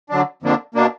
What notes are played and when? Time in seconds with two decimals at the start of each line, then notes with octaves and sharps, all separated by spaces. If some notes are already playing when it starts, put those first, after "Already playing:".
0.10 D3 F#3 D4
0.42 F2 D3 F3 A#3 D4
0.75 B2 A#3 D4